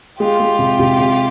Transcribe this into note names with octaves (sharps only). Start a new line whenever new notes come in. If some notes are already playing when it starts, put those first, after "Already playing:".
G#3 F4 G4
G#3
C3
C3
C3